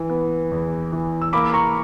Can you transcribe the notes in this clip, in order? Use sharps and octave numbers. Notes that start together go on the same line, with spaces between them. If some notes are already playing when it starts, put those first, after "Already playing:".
Already playing: E3
B3
E2
E3
E6
A#3 B5 D6
A#5 C#6